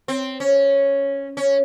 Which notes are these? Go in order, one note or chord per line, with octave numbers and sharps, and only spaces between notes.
C4
C#4
C#4